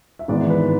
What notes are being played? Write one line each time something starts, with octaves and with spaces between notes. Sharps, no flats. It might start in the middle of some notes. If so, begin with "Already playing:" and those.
E5
G#1 G#2 E3 B3 D5
B4